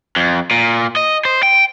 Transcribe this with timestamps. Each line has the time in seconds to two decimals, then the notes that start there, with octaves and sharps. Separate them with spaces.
0.16 F2
0.51 A#2
0.96 D#5
1.25 C5
1.43 G5